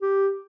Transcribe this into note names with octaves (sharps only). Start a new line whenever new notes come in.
G4